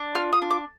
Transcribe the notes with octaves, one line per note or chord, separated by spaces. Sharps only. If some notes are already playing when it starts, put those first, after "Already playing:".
Already playing: D4
F4 F6
D#6
D4
D6